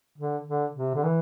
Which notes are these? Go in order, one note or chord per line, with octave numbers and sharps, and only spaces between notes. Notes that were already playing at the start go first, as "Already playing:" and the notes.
D3
D3
C3
D3
E3